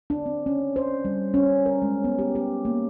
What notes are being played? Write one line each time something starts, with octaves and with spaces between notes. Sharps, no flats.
D4
C4
C#4
C5
G3
C#4
A#4
G#3
B3
G4
G4
A#3